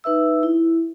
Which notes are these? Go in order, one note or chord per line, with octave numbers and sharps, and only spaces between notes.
D#4 B4 E5 E6
E4